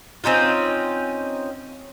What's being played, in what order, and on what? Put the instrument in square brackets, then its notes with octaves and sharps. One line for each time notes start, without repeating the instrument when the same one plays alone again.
[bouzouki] C4 C#4 D#4 F4